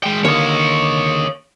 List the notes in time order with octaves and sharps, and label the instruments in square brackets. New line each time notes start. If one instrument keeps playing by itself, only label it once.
[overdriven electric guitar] G#3 G5
[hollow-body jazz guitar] D#2 D3 A#3 [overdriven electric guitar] C#5 D#5